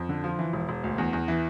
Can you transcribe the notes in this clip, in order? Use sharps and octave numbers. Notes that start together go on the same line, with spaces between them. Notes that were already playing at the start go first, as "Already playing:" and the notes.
Already playing: F2
D3
F3
E3
E1
E1
D2
E2
E2
E3